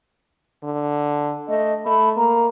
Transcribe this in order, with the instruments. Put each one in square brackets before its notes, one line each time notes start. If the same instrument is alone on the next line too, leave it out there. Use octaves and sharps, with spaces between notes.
[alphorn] D3
[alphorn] A3 [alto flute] D#5
[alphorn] A3 [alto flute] B5
[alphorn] A#3 [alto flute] A#5